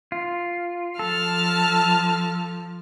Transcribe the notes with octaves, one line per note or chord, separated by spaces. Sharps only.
F4
F3 A4 A5 F6